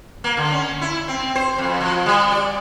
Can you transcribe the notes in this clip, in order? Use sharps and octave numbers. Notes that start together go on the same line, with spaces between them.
A#3
D3
C#4
E4
C4
C5
F2
F3
G3
D5